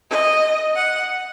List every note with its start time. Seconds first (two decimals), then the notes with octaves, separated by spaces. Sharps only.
0.10 D#5
0.76 F#5